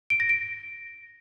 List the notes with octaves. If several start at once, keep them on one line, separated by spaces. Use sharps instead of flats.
D7
A#6
D7